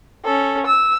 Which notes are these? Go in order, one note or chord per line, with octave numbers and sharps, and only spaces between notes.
C#4 A4
E6